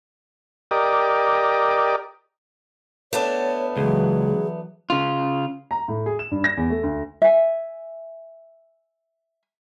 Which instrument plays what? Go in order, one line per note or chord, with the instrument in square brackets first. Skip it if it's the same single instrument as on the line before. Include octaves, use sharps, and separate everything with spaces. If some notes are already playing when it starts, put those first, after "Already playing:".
[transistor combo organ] G4 A#4 D5 D#5
[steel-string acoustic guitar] A3 B3 D4 [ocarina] C#5
[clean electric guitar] C#2 [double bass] E3 F#3 [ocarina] G#4
[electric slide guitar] C#3 F4
[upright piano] A#5
A2
G#4
E7
G2
A#6
E2
A3
D2
[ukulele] E5 G#5